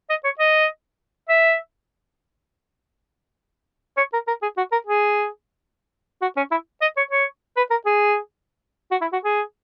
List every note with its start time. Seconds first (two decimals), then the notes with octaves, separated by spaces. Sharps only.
0.10 D#5
0.24 C#5
0.39 D#5
1.29 E5
3.97 C#5
4.13 A#4
4.27 A#4
4.42 G#4
4.57 F#4
4.72 A#4
4.87 G#4
6.22 F#4
6.37 C#4
6.51 E4
6.81 D#5
6.97 C#5
7.11 C#5
7.57 B4
7.71 A#4
7.86 G#4
8.91 F#4
9.01 E4
9.13 F#4
9.24 G#4